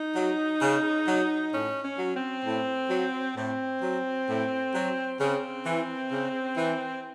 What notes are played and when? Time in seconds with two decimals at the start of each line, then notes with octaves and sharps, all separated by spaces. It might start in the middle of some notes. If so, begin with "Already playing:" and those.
Already playing: D#4
0.15 F#3
0.61 C#3
1.07 F#3
1.52 A2 C#4
1.84 C#4
1.98 F#3
2.14 C4
2.45 A2
2.90 F#3
3.36 A2 C4
3.81 F#3
4.28 A2
4.74 F#3
5.20 C#3 C4
5.65 E3
6.11 C#3
6.57 E3